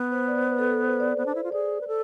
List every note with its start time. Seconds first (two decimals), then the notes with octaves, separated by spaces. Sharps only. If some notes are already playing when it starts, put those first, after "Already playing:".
Already playing: B3
0.11 C5
0.28 D5
0.36 C5
0.47 B4
0.59 A4
0.71 A4
0.82 C5
1.00 D5
1.17 B3 C5
1.26 D4
1.35 E4
1.44 F4
1.52 G#4 D5
1.81 B4
1.88 A4